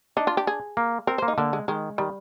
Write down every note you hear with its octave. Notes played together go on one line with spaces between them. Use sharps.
D4 D#4
F4
G4
G#4
A#3
C4 A#4
A#3 C5
D#4
D3 A#3
G#3
D#3 G#3
D#3 G3